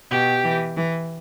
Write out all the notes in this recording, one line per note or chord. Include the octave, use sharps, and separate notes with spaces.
B2 G4
E3
E3